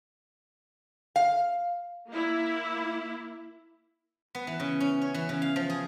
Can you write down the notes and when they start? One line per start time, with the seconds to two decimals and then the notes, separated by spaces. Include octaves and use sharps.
1.16 F5
2.12 A#3 E4
4.35 B3
4.47 E3
4.60 C#3
4.80 C#4
5.02 C#5
5.14 E3
5.29 C#3
5.42 F5
5.56 F3
5.70 G#4